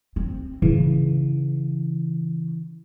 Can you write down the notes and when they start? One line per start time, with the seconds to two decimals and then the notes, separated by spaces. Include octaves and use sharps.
0.16 C4
0.62 C#3 E3